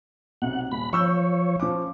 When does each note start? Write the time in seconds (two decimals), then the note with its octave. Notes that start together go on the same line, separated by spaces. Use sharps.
0.42 B1 C3 F#5
0.72 D#1 B5
0.93 F3 C#5 C#6 E6 G6
1.59 F3 C#4 D6